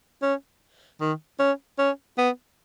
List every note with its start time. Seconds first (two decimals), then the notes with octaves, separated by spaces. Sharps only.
0.22 C#4
1.00 D#3
1.40 C#4
1.78 C#4
2.18 B3